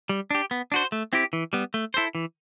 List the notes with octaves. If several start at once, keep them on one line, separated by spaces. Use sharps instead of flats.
G3
D4 G4
B3
D4 F#4 C5
A3
C4 E4 G4
E3
G3 B3
A3
E4 A4 C5
E3